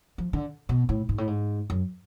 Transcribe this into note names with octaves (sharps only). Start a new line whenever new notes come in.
F3
D3
B2
A2
G#2
A2
G#2
F#2